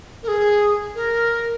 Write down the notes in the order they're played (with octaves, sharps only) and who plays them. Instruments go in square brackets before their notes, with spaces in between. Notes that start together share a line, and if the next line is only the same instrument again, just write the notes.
[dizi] A#4
G#4
A#4